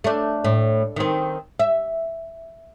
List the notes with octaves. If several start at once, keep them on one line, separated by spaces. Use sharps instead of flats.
A3 D4
A2
D#3 C4
E5